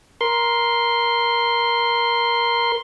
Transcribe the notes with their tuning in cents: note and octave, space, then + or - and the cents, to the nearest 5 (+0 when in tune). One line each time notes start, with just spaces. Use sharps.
A#4 +15 C6 +0